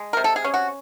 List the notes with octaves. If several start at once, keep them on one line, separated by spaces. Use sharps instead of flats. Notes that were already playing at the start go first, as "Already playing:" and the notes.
Already playing: G#3
C3 A#4
A4
G#4
C#4
F#4